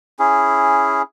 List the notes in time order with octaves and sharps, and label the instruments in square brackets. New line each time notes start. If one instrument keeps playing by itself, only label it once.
[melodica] C#4 E4 G#4